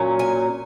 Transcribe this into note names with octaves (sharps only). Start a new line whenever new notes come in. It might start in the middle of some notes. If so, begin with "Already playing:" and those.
Already playing: A#2 F#3 C#4
G#5